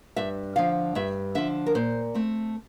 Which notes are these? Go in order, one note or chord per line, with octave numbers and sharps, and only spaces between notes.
G2 E5
D3 F3 F5
G2 E5
D3 F3 E5
A#4
A#2 C5
A3 C4